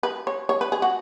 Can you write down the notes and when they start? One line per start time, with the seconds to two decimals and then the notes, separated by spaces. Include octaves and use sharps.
0.03 B4
0.27 C#5
0.49 C#5
0.61 B4
0.72 G#4
0.82 F#4